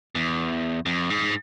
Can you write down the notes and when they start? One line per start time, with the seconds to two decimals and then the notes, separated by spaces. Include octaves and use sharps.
0.15 E2
0.86 F2
1.10 G#2